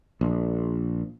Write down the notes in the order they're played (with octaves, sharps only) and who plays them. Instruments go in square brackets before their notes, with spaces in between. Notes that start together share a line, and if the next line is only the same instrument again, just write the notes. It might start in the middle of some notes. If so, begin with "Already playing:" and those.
[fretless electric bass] A#1